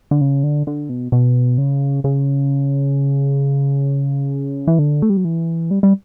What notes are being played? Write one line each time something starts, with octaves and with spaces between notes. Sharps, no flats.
D3
C#3
D3
D3
B2
B2
C#3
C#3
E3
D3
A3
G3
F#3
E3
G3
G3